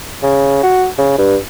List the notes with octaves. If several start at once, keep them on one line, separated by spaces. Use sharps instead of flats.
C#3
F#4
C#3
G2